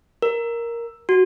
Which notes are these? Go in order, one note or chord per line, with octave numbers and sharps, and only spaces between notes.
A#4
F#4